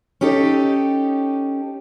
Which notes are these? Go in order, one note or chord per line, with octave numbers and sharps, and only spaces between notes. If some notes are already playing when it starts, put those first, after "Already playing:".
C#4 D#4 G4 A4